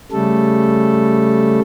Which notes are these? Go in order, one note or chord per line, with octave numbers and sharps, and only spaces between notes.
C#3 G3 A3 A4